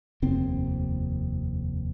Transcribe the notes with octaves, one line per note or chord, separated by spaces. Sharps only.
F1 D#2 C4